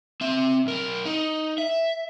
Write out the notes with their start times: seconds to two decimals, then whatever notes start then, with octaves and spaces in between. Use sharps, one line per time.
0.21 C4 E5
0.66 B1 A#4
1.05 D#4
1.58 E5